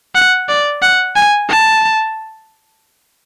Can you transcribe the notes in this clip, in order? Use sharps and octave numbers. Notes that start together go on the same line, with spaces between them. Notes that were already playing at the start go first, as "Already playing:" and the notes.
F#5
D5
F#5
G#5
A5